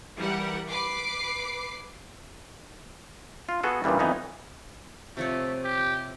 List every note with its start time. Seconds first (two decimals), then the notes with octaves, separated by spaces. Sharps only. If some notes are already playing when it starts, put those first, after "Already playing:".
0.16 E3 G3 A#4 F#5
0.69 B4 D6 C7
3.49 F4
3.63 B3 F#4 G#4 A4
3.84 G2 A#2 C#3 E3 G3
3.99 F2 E3 B3 D#4
5.17 C3 F3 A3 C#5
5.64 G4